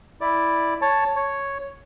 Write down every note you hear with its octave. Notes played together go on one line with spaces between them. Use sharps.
E4 D5
C#5 A5
C#5